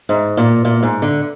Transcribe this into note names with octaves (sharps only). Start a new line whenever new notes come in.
G#2
A#2
A#2
G#2
D3